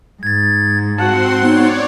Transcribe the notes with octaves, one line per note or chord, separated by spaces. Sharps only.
G#2 G#6 A6
C4 F#4 F#5 A5 C6
B3 D#4 C#5 D5